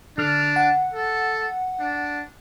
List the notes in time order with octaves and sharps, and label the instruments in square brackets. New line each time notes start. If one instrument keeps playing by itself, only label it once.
[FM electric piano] D3 F6 [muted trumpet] D4
[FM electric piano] F#5
[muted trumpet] A4
D4